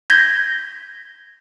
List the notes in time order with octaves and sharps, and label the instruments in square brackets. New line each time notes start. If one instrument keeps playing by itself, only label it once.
[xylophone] G6 G#6 A#6 B6 G7